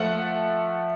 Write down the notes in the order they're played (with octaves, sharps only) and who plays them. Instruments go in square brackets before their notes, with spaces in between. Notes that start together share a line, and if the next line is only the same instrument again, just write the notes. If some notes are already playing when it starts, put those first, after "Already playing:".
Already playing: [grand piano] F3 A3 F#5